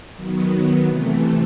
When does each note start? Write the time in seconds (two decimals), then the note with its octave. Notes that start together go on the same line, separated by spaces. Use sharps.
0.14 D#3 F#3 B3
0.86 C3 E3 A3